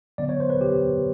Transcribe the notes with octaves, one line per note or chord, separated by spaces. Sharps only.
D3 F#3 B3 D5
C#5
C5
B4
G4